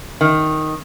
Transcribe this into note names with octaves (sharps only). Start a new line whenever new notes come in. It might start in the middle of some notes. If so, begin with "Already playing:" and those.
D#3